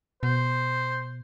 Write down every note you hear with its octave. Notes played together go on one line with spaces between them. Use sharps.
B2 C5